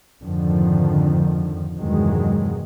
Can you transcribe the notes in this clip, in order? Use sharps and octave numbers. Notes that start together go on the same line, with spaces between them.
F2 G#2 D3 D#3 F3
E2 G2 C3 D#3 F#3 G#3